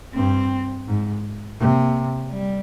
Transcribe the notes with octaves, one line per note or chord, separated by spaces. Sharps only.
G2 C4
G#2
C3 A#3
G3